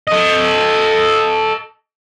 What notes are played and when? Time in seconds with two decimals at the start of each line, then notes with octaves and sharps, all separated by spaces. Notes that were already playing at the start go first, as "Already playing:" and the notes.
0.07 A4 D#5